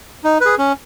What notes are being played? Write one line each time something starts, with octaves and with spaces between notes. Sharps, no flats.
D#4
G#4 B4
C#4